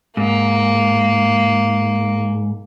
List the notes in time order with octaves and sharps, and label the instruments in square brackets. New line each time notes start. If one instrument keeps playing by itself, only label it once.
[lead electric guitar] G#2 [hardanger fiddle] A#3